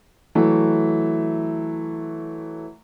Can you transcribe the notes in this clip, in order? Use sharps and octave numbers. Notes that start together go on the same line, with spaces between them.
E3 F#3 A3